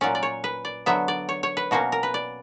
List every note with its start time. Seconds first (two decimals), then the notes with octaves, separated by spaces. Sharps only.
0.01 A#2 F#3 C#4 D5
0.15 D5
0.23 C#5
0.44 B4
0.65 D5
0.86 D3 F#3 B3 E5
1.08 D5
1.29 C#5
1.43 C#5
1.57 B4
1.71 B2 A#3 C#4 F#4
1.92 A#4
2.03 B4
2.14 D5